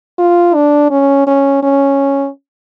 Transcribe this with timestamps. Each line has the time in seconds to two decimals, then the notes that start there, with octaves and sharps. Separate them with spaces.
0.19 F4
0.54 D4
0.91 C#4
1.27 C#4
1.63 C#4